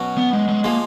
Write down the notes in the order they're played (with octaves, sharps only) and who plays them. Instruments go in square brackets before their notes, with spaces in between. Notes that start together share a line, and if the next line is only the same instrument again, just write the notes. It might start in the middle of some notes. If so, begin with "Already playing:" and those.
Already playing: [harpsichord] B2 F#3 C#4
[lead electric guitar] B3
G#3
G#3
[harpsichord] F3 G#3 [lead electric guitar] A#3